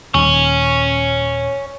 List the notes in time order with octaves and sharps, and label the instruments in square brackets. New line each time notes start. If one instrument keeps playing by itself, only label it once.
[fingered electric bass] D#1 [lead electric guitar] C#5 G#5